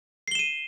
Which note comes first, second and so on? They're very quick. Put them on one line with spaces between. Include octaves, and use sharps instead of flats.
C7 G7 E7 D#7